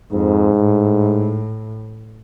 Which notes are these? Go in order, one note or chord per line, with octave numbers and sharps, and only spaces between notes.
F2 G#2
A2